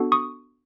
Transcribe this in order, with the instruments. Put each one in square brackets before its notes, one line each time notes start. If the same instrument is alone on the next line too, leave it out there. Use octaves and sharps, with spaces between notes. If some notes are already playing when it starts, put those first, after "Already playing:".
Already playing: [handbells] B3 D4 F#4 A4
C#6 D#6